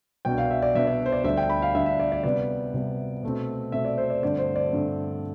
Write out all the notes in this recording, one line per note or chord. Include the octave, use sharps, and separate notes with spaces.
C2 B2 B3 D4 G5
F5
E5
D5
C2 B2 B3 D4 E5
D5
C5
D5
D2 D3 G3 D4 E5
G5
B5
F5
D2 D3 G3 D4 E5
E5
D5
D5
C3 G3 B3 D5
C3 G3 B3
B2 A3 C4
B2 A3 C4 E5
D5
C5
D5
G2 D3 A3 C4 D5
C5
D5
G2 D3 A3 C4